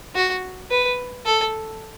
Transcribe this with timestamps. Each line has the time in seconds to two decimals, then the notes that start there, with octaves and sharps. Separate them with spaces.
0.15 F#4
0.71 B4
1.26 A4